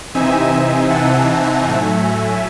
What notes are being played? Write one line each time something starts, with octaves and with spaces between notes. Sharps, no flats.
C3 E3 C4 D#4 E5 G#5
F#5 A5
A2 F#3 A3 E5 G#5